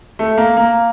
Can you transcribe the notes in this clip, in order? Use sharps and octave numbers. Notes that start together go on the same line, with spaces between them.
A3
A#3
A#3